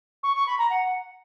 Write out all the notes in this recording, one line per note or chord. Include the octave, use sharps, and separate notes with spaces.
C#6
C#6
B5
A#5
F#5